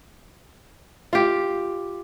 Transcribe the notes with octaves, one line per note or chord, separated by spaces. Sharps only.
F4 G4